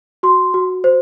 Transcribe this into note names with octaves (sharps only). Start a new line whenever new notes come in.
F#4 C6
F#4
C5